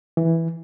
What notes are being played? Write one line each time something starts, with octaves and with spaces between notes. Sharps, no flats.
E3